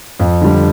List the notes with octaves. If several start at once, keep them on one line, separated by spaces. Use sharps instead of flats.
F2
D3 G3